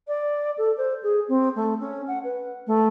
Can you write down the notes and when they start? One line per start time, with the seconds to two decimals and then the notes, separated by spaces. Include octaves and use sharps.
0.08 D5
0.58 A4
0.77 C5
1.03 G#4
1.28 C4
1.55 A3
1.80 C#4
2.08 F#5
2.24 B4
2.67 A3